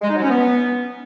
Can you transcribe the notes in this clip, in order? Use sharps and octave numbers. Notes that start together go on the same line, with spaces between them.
G#3
D#4
F#3
C#4
B3